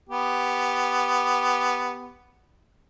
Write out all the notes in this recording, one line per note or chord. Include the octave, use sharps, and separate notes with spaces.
B3 G4